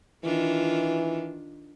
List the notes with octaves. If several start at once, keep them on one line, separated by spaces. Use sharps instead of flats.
D#3 E3 D4 F4